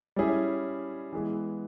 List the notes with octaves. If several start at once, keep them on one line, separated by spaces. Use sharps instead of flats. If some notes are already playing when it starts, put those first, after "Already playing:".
G3 C#4 E4 G#4
E3 G#3 B3